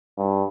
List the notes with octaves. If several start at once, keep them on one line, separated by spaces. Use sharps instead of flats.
G2